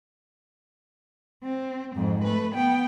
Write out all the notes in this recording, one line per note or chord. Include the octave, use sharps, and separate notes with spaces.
C4
F2 G#2
A3 B4
B3 G5